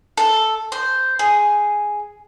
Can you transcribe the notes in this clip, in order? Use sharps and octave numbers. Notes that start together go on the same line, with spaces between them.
A4
C5
G#4